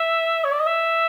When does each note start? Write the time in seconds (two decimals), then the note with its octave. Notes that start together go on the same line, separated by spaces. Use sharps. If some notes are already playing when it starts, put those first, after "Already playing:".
Already playing: E5
0.44 C#5
0.52 D5
0.59 D#5
0.66 E5